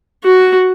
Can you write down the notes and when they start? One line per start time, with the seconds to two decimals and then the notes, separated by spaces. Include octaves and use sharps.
0.24 F#4